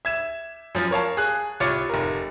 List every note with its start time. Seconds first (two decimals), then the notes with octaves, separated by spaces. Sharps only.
0.05 E5 G#6 E7
0.75 F#2 F3
0.91 A#4 C#5 F5 A5
1.17 G#4 F#6
1.60 C2 F4 C#5 D6 A6 C#7
1.89 F1 A#4